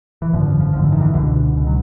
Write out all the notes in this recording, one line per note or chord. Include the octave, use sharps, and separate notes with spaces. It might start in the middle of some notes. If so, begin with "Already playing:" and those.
E3
G#1 F#2 D3 F3
F3
F3
G#1 F#2 D3 F3
E3
D#3
E3
C#2 B2 D3
C#2 B2
F#3